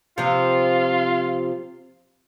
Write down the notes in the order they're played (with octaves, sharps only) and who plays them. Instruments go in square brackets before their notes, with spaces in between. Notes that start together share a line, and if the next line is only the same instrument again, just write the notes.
[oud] C3 F3 [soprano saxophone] F4